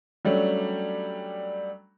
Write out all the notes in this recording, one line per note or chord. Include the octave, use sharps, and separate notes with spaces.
F#3 G3 A3 C#4 D4